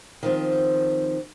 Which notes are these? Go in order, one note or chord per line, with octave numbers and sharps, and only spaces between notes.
D#3 F3 C4